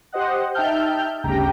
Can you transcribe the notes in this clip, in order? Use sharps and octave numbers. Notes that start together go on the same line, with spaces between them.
G4 C5 D#5 F#5
D#4 E5 G5 A5 F6 G6
G1 D2 C#3 G4 G5 A#5